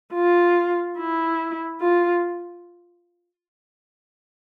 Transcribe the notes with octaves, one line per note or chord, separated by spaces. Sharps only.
F4
E4
F4